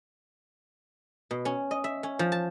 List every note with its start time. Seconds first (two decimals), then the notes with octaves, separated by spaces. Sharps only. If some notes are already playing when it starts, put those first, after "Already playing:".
1.31 B2
1.45 C#4
1.71 D#5
1.84 E5
2.03 C#4
2.19 F3
2.32 A5